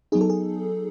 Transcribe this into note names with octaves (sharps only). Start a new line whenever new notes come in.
F#3 B3 D#4 G#4
A4
G#4